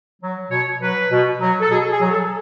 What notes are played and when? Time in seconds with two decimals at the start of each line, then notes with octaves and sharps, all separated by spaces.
0.22 F#3
0.51 B2 C#5
0.81 F#3 B4
1.12 B2
1.41 F#3
1.60 A4
1.70 B2 G#4
1.91 G#4
2.01 F#3
2.11 A4